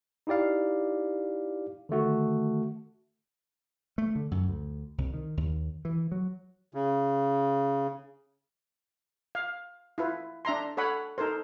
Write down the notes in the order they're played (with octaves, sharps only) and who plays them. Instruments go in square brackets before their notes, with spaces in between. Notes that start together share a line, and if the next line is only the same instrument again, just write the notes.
[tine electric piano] D#4 E4 G4 D5 F5
D3 D#3 A3 F#4
[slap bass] A3
D3
F#2
D2
C2
D#3
D#2
E3
F#3
[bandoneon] C#3
[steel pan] F5
E4 F4 B4
D4 E5 A#5 C6
A4 C#5 F#5 B5
D#4 A4 A#4 C5